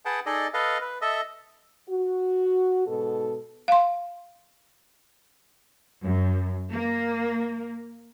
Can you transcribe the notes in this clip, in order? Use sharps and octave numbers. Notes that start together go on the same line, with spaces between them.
G#4 B4 F#5 G5 A5
D#4 G#4 A4 D5 D#5
A4 B4 D#5 F5
B4
A4 D#5 E5
F#4
G#2 B2 A4
F5 C6
F#2
A#3